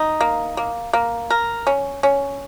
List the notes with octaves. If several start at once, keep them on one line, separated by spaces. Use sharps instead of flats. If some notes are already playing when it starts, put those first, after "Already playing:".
Already playing: D#4
A#3
A#3
A#3
A#4
C#4
C#4